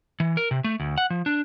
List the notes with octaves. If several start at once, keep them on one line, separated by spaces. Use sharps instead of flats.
E3
A#4
C3
A3
D2
F#5
F3
D4